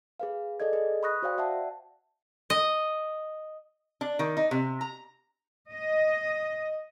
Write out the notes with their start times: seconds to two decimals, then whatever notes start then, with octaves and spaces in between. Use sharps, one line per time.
0.20 G#4 B4 F5
0.60 G#4 A4 D5 D#5 G#6
0.73 G#4 B4 D#5
1.03 B5 C#6 D#6 F#6 A#6
1.22 F#4 C5 D5 F5 G5
1.38 D5 E5 F#5 G5 A5
2.50 D#5
4.01 D4
4.19 D#3
4.37 D#4
4.51 C3
4.81 A#5
5.72 D#5